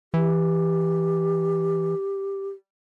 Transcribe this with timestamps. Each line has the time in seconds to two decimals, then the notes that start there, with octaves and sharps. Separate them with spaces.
0.14 E3 G4